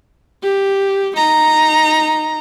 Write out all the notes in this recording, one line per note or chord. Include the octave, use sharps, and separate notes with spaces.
G4
D#4 A#5